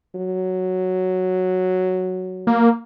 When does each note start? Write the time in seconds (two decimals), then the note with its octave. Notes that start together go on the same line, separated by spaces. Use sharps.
0.16 F#3
2.47 A#3